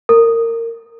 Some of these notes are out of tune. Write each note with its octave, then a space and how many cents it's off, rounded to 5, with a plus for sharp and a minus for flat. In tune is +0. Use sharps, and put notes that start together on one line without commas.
A#4 -25